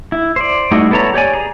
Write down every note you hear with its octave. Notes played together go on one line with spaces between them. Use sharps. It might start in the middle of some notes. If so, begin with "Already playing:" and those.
E4
C5 D5
G3 A3 D#4 E4 F#4
B3 E4 A4 C#5 A#5
G4 C#5 D5 G#5
G#4 A#5